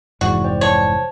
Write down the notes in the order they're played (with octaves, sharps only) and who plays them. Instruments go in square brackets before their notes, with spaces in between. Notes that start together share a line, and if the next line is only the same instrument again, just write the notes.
[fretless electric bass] F1 G#2 E3 [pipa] F#4 [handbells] D5
[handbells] C5 D5 G5
[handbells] C5 A5 [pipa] C#5